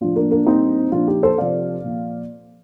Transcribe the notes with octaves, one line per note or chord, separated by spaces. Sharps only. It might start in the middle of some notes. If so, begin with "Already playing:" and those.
A2 F3 D4 F4
A#3 D4
A#3 D4
A#2 G3 C4 D#4
A#2 F3 D4 F4
D#4 G4
A4 C5
C3 F3 D5 F5
A#2 F3